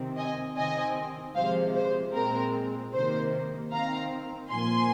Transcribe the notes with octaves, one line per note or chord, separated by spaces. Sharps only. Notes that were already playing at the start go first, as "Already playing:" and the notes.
Already playing: C3 D#3 C4
D#5 G#5
C3 D#3 C4 D#5 G#5
C3 F3 G#3 C5 F5
C5
A#2 G#3 C4 A#4
C3 D#3 A#3 C5
D#3 C4 F5 A#5
A#2 F3 A#3 G#5 C6